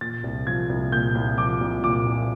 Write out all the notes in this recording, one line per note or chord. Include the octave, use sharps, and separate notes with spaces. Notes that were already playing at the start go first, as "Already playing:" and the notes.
A#2 A6
C2
F3 G#6
C2
A#2 G6
C2
F3 D6
C2
A#2 D6
C2